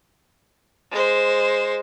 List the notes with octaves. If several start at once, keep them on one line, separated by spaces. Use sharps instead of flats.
G#3 C5